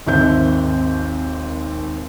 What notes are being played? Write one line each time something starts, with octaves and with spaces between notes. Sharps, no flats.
G#1 D#2 C4 E5 G6